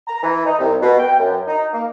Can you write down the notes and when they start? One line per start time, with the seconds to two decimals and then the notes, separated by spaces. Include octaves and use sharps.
0.07 A#5
0.22 E3
0.45 D#4
0.59 C2
0.80 B2
0.98 G5
1.19 F#2
1.47 D#4
1.72 A#3